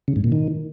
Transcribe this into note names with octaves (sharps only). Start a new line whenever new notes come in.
C#3
G#2
A#2
D#3